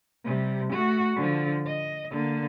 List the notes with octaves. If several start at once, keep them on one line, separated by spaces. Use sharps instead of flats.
C3 G3
A3 F#4
D3 F3
D#5
D3 A#3